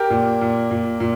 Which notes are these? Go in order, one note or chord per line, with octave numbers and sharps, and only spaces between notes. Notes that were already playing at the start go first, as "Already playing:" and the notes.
Already playing: G4 A#4
A#2
A#2
A#2
A#2